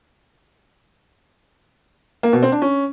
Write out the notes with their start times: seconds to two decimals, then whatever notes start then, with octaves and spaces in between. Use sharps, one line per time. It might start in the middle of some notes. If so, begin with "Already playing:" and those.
2.23 A#3
2.33 B2
2.43 C4
2.52 D4
2.62 C#4